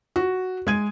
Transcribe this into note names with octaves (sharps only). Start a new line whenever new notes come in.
F#4
G#3 G#6 D#7